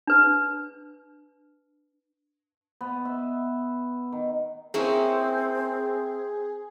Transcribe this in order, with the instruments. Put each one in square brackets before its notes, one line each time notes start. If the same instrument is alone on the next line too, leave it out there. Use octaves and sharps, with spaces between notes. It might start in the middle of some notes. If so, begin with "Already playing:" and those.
[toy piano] D4 B4
[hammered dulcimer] B3
E5
D#3
[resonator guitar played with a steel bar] A#3 C#4 E4 [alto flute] C4 [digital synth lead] G#4